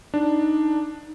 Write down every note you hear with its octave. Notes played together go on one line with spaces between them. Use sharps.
D4 D#4